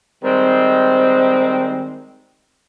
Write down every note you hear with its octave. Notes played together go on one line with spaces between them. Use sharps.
D#3 G3 G#3 C4